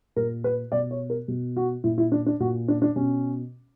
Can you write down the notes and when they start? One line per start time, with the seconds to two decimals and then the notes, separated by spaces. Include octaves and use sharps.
0.16 A#2 A#4
0.44 B4
0.72 B2 D5
0.91 C#5
1.10 A#4
1.28 B2
1.57 F#4
1.84 A#2 E4
1.98 E4
2.12 D4
2.26 D4
2.40 A#2 F#4
2.68 D4
2.82 D4
2.96 B2 C#4